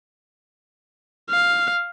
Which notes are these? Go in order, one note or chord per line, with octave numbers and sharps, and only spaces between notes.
F5